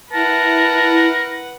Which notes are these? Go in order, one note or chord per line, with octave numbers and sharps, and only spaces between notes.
E4 A#4 B4 F#5 A5